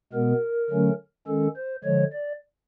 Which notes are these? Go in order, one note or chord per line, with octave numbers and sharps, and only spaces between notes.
B2 G#3 B3 A#4
D3 F#3 A3 C#4
D#3 G#3 C#4 A4
C5
D3 F3 G#3 C#5
D5